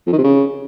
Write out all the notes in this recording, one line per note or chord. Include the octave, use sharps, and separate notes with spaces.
F2
D#3
C3
C#3